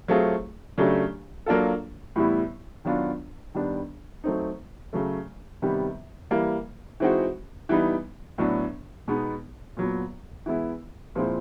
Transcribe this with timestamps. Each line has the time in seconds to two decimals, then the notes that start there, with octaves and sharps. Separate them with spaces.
0.08 F#3 A3 C4 F4 G#4
0.78 C#3 F#3 A3 D4 G4
1.46 F#3 A#3 D4 F4 A4
2.16 A2 E3 G3 B3 E4
2.85 D#3 F#3 B3 D4 F4
3.55 D#3 G3 B3 D4
4.24 F#3 A3 C4 D#4
4.93 C#3 F#3 A3
5.62 C3 D#3 G3 B3
6.31 E3 G3 A#3
7.00 E3 G#3 C4 D#4 F#4
7.69 E3 G3 B3 D#4
8.38 A2 F#3 B3 D4
9.08 B2 G#3 B3 D#4
9.77 A#2 F#3 B3
10.46 E3 G#3 B3 E4
11.15 A#2 F3 G#3 C4 E4